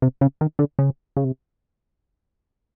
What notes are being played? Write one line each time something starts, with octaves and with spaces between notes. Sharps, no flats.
C3
C#3
D#3
D3
C#3
C#3
C3